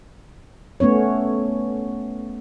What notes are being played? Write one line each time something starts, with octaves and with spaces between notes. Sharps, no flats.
A3 B3 C#4 C#5